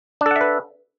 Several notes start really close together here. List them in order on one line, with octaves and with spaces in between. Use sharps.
D4 A4 F#5 E5 B4